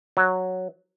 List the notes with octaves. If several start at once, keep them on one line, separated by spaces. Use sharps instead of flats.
F#3